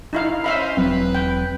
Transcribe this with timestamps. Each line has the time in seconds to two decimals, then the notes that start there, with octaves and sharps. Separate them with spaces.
0.13 D#4 E4 F5
0.44 C#4 D#4 C5 E5 F5 B5
0.77 E1 F#3 C4 B4
1.15 G5